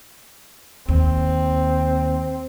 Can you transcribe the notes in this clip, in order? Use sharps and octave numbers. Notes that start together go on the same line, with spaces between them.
D#2 C4